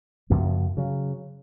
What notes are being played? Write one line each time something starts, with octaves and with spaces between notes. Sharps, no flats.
F#2 C#3 F3 A#3
C#3 F#3